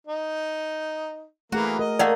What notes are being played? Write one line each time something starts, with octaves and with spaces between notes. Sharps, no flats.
D#4
E3 A3 A#3 F#4 G#4
A#4 D#5
A3 A#3 D5 F#5